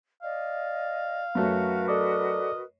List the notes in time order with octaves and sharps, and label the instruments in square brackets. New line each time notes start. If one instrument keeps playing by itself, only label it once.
[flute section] D5 D#5 [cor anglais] F5
[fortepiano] F#2 A3 [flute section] F#4 A#4 B4
[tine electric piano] A4 D5 D6 [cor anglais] D#5